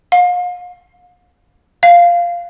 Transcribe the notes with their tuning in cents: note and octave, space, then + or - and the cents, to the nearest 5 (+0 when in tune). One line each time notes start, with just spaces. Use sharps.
F5 +40
F5 -5